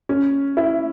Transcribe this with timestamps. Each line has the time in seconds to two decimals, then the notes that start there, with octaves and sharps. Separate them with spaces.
0.09 C#4
0.57 E4